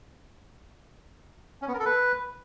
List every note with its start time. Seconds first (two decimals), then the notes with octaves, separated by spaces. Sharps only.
1.62 C#4
1.68 B3
1.74 A#4
1.79 A4
1.85 B4